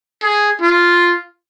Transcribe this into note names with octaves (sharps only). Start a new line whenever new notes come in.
G#4
F4